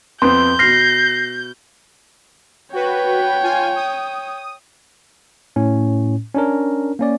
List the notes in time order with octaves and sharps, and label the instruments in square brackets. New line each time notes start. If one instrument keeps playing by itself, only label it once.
[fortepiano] F2 B3 C4 [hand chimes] C6 [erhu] G6
[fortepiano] B2 F6 [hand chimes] A#6 C7
[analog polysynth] F#4 B4 [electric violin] C#5 G5
[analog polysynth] F4 G#5
D#6
[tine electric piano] A2 C#4
C#4 D4 A#4
A#3 C#4 D5